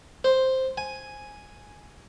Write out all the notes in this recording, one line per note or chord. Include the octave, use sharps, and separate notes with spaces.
C5
G#5